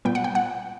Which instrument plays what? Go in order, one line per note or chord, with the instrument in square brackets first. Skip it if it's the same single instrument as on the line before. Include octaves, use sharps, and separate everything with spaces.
[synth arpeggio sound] A#2 G3 B3 G5
F#5
G5
F#5